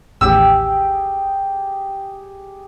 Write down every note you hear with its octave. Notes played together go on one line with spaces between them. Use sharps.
A1 D#2 G4 G#4 G5 E6